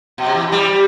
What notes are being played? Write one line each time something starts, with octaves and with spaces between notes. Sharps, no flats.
B2
C3
E3
G3